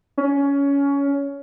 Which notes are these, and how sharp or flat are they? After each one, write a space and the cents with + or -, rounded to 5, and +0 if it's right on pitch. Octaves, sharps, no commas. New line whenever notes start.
C#4 +20